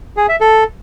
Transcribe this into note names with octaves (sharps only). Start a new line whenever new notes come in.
G#4
E5
A4